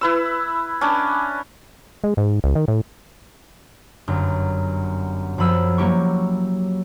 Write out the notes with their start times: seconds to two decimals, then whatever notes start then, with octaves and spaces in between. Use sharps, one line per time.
0.01 E4 B4 E6
0.81 C#4 D4
2.04 G#3
2.17 G#2
2.44 C#2
2.55 D#3
2.68 A2
4.08 G1 F#2
5.38 F#2 F3 B5 E6
5.78 F#3 A#3 E4 G4 C#6